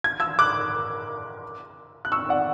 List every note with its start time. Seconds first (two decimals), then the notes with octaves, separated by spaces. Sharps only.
0.04 G#6
0.20 E6 G#6
0.39 D6 F#6
2.05 F#6
2.12 C#6 E6
2.29 D5 F#5